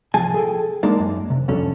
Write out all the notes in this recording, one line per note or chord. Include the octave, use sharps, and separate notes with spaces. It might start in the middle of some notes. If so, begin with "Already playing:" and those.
C2 F3 G#4 G#5 A5
G#4 A4 G5
G#3 A#3 D4 D#4 D5
F#2
C3
C2 F2 C#4 D4 A4